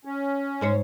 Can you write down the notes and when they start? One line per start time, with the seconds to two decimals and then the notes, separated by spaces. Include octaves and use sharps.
0.05 C#4
0.61 G#2 C5 C#5